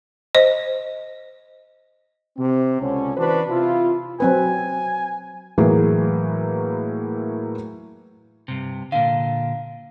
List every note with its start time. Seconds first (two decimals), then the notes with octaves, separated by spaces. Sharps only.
0.35 C5 D#5
2.37 C3 C4
2.82 C#2 D3 C#4
3.17 E3 D4 F#4 B4 C5
3.49 C3 E4 F4
4.20 F#3 C4 B4 G#5
5.58 A2 E3 F#3 A#3 G#4
8.48 G2 C3
8.92 A#2 D3 F5